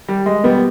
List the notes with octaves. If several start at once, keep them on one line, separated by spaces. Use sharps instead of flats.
G3
G#3
B2 G3 B3